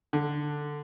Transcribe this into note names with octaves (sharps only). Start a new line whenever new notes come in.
D3